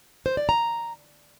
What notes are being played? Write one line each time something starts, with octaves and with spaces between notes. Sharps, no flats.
C5
D5
A#5